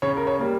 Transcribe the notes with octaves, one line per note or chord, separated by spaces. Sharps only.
C#3 C#5
A#4
C#5
G3 A#3